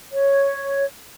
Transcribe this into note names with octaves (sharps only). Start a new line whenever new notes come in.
C#5